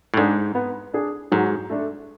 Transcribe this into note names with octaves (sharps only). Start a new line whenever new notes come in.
A2
G#2 D4 G#4
B3
D4 G#4
G#2 F#3
A3 D4 A4